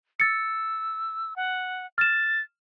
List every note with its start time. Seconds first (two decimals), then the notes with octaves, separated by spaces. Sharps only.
0.20 E6 A6 C#7
1.36 F#5
1.98 F6 A6 E7